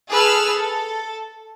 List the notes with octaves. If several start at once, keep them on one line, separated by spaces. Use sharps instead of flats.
G#4 A4 B4 E6 F6
A4